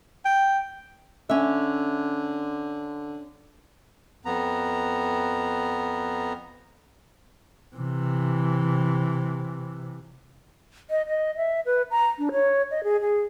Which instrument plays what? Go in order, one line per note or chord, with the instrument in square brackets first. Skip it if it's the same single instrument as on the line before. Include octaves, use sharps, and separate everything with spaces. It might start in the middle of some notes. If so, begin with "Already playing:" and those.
[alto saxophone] G5
[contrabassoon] D3 [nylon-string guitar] C#4 E5
[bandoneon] F2 B3 A#5
[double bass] C3 E3
[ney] D#5
D#5
E5
B4
A#5
D4
C#5
D#5
G#4
G#4